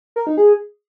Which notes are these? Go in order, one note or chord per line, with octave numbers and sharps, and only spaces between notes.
A#4
D#4
G#4